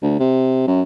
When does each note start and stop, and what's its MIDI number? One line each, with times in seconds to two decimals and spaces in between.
0.02 0.17 38
0.19 0.64 48
0.67 0.82 42